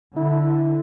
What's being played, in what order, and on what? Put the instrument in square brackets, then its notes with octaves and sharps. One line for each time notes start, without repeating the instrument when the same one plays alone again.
[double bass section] D3 [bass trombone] E4